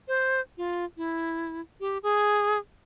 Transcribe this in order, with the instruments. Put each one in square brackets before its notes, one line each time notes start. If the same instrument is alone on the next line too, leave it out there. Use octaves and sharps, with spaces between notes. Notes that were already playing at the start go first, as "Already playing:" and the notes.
[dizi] C5
F4
E4
G4
G#4